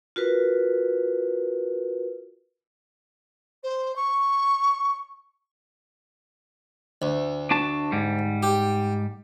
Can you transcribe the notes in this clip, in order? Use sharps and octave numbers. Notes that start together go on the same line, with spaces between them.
F4 F#4 A#4 B4
C5
C#6
D2
D4 F#4 A5
G#2 G3
G4